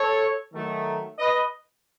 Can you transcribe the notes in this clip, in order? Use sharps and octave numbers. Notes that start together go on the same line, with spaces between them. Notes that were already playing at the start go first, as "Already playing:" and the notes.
Already playing: A4 C#5
D#3 F#3 A3
B4 D#5